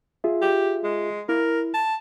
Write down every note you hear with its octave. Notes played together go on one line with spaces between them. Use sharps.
F4 G#4 E5
G4
G#3
E4 A#4
A5